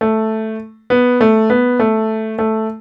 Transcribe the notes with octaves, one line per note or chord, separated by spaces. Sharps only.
A3
B3
A3
B3
A3
A3